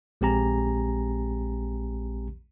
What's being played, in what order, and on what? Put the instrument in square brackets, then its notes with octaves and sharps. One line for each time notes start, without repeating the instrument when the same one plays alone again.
[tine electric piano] A#1 G#3 C4 G4 G#5 A#5